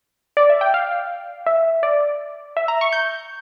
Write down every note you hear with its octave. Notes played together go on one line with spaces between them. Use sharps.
D5
E5
G5
F5
E5
D5
E5
A#5
C#6
G6